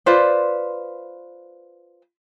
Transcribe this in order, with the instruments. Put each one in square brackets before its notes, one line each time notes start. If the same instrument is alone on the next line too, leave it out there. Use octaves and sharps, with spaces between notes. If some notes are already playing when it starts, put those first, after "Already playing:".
[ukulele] F4 B4 C5 D5